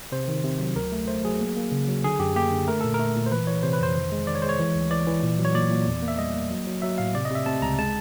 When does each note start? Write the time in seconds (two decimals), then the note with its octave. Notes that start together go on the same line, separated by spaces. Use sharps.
0.12 C3 C5
0.28 D#3
0.44 C3
0.60 F#3
0.76 D2 A#4
0.92 A3
1.07 A3 C5
1.25 F#3 G#4
1.40 A#3
1.57 A#3
1.71 C#3
1.88 F#3
2.04 D3 G#4
2.19 F#2 G4
2.36 A#3 G4
2.52 D3
2.68 A3 A#4
2.81 A#2 A4
2.94 A#4
3.00 A3
3.16 A#2
3.26 C5
3.32 E3 B4
3.47 E3 C#5
3.63 C3 C5
3.73 B4
3.80 F2 C5
3.96 D#3
4.12 G#3
4.27 D#3 D5
4.35 C#5
4.42 G#3 C5
4.49 C#5
4.59 E3
4.75 D2
4.90 E3 D5
5.07 E3
5.23 A#2
5.39 F#3
5.45 C#5
5.55 A#2 D5
5.71 A#2
5.86 E2
6.02 A#3
6.08 E5
6.18 G3 D#5
6.35 A#3
6.50 F#3
6.67 F#3
6.82 F#3 E5
6.98 A2 F5
7.14 C3 D5
7.25 D#5
7.30 C3
7.35 E5
7.46 C3 A5
7.62 C#2 A#5
7.79 G#3 A5